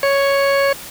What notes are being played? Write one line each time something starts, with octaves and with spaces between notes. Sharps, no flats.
C#5